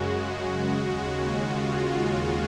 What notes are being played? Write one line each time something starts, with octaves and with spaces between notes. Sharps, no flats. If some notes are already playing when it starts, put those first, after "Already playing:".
Already playing: F#2 C#3 G#3 F#4
F#4
D#2 C#3 G#3 F#4
F4